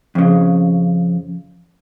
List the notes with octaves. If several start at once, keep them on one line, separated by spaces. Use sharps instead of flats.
F2 C#3